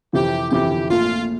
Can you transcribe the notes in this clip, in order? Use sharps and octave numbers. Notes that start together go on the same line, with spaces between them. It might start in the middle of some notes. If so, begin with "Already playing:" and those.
F2 C3 E3 G4
F2 C3 E3 G4
A#1 A#2 A3 F4